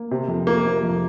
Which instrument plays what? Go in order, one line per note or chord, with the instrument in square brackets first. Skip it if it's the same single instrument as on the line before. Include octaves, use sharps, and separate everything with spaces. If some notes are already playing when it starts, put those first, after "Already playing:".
Already playing: [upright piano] A#3
C3
F2
[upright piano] F3 [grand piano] A#3
[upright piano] C3
F2